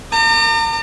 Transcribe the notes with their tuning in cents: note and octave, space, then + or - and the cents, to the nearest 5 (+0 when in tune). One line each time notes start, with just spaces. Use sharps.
A#5 -40 D6 +35